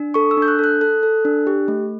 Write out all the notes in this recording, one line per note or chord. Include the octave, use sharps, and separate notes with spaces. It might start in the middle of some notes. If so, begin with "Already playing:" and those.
Already playing: D4
A4 C#6
E6
D4
G6
F#6
A4 F#6
A4 F#6
A4
D4
G4
A3